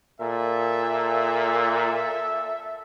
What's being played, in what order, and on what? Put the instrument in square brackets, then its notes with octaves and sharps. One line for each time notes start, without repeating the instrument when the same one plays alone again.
[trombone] A#2 [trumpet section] A4 E5